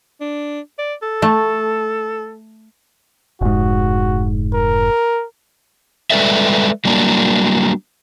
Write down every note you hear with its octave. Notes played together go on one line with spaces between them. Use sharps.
D4
D5
A4
A3
F1 G#2 F#4
A#4
G3 G#3 A4 B4 D5 E5
F#3 G3 A#3 D4